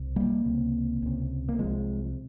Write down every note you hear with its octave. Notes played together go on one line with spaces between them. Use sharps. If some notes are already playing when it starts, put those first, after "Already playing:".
Already playing: C2
G3 A#3
C#2 C3
C#2 C3
A#3
C2 C3 F3 G#3